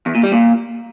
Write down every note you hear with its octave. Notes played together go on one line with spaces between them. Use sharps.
E2
A#2
G3
A#2